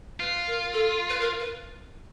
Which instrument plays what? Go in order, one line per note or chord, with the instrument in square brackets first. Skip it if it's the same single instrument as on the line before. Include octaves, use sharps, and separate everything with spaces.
[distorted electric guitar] F4 [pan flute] B4
[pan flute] A#4
A4
B4
A#4
B4